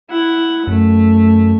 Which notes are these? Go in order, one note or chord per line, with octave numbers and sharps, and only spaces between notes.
E4 F#5
F#2 A3